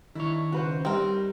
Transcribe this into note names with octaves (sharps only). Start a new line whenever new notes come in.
D#3 D4 E4 C#5
C#3 C#4 F#4 B4 C5
G3 C4 D#4 A#4